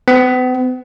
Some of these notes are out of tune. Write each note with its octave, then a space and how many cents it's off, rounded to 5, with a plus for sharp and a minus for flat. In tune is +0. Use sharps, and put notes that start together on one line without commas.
B3 +45